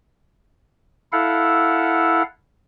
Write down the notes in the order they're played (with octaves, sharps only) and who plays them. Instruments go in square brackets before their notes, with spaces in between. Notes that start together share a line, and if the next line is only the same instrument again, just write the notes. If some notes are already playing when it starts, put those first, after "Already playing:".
[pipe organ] E4 A4 F5 F#5